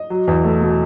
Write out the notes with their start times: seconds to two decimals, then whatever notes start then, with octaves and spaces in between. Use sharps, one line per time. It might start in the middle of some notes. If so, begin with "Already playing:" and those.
Already playing: D#5
0.10 F#3
0.27 E2
0.44 A3
0.61 B2